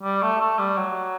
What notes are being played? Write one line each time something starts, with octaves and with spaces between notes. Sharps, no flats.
G3
A3
A3
G3
F#3